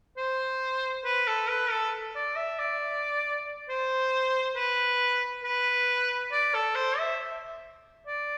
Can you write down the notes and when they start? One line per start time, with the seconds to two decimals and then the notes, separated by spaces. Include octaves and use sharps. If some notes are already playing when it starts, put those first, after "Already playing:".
0.17 C5
1.04 B4
1.27 A4
1.49 B4
1.71 A4
2.15 D5
2.36 E5
2.59 D5
3.69 C5
4.56 B4
5.44 B4
6.32 D5
6.54 A4
6.75 C5
6.98 E5
8.07 D5